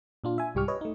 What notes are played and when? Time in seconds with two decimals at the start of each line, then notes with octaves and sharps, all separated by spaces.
0.24 A#2 D4 F4
0.38 E5 G#5
0.55 C2 G#2 G3 G4 C#6 F6
0.68 B4 C#5 D#5
0.81 A3 D#4